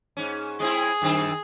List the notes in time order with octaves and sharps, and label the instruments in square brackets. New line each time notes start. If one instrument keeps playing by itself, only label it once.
[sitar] G#2 C#4
[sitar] G#3 C4 E4 [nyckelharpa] G#4
[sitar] F#2 D#3 C4